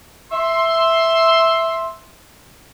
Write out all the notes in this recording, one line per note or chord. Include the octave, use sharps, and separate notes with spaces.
E5 C6